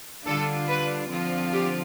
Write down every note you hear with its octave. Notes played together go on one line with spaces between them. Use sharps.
D3 G3 D4 F4 A4
B4
D3 F3 C4 F4
G4